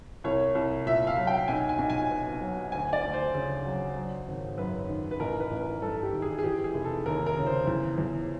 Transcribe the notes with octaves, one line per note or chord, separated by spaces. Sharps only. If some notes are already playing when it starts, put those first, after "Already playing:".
C2 C#5
C2
A#2 E5
F5
F#3
G5
B1 G#5
G#5
B1
G#5
B2
F#3
D2 G#5
D5
D2
C5
C#3
F#3
F#3
G#1
F#2 B4
D#3
B4
A1 A#4
B4
A1
A#4
G2 A4
G4
D#3
G#4
G#4
E3 G4
G#4
F1
A4
D#2 A#4
A#4
C#3
C5
E2
E2